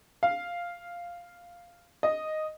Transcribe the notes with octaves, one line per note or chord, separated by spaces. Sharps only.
F5
D#5